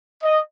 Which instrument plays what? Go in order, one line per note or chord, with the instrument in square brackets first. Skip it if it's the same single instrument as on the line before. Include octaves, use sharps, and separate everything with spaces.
[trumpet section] D#5